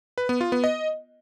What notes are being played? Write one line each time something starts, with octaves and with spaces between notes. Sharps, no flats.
B4
B3
F4
B3
D#5